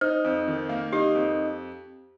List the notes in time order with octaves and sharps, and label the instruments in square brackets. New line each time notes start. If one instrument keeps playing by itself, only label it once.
[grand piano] D#4 [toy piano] C5
[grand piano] F2
D#3
A#3
[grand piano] D#4 [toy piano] G4
[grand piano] F2